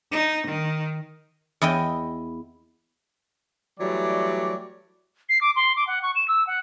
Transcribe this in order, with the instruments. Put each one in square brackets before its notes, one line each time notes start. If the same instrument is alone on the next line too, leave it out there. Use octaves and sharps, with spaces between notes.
[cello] D#4
D#3
[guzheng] E2 E4 D#5 G5
[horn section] E3 F#3 G3 A3 D5
[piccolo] C7
D6
C6
D6
F#5
C#6
E7
E6
F#5